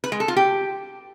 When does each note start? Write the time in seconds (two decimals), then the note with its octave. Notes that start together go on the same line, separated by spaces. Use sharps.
0.04 B4
0.12 G#3
0.20 A4
0.28 F4
0.36 G4